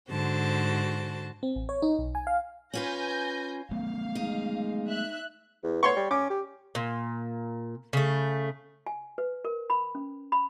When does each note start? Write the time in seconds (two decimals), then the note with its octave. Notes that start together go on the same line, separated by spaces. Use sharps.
0.10 G#2 D3 F#4 C5 A5
1.43 C4
1.56 A1
1.69 C#5
1.82 D#4
1.99 B1
2.15 G#5
2.27 F5
2.74 C#4 F4 B4 G#5 G6 A#6
3.71 F#3 A3 B3 F5
4.15 G#3 D#4
4.89 E5 F#6
5.64 E2
5.83 B3 C#5 C6 C#6
5.96 G3
6.11 C#4 D6
6.30 G4
6.75 A#2
7.93 C#3 A3
8.87 G#5
9.18 B4
9.45 A#4
9.70 B5
9.95 C#4
10.32 B5